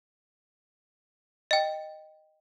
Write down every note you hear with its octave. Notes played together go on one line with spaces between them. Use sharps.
D#5 G5